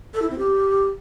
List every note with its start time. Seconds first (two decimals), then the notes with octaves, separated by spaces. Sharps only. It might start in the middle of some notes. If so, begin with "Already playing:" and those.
0.14 A4
0.22 E4
0.30 C4
0.38 G4